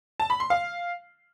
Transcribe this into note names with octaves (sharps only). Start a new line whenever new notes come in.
A5
B5
C6
F5